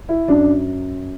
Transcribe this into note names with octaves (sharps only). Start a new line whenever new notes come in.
E4
F#2 D4